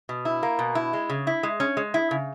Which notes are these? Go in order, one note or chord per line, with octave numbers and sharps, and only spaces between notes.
B2
E4
A#3
B2
E4
G#3
C#3
E4
G#3
C#4
G#3
E4
C#3